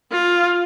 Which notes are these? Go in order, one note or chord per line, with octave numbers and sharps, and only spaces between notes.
F4